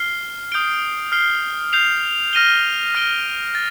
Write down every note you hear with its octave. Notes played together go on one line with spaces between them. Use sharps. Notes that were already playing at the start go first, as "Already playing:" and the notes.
Already playing: F6 C7 G7
D#6 G6 D7 G7
F6 C7 G7
G6 C7 F7
F6 A#6 D#7 G7
F6 A#6 D7 G7
A6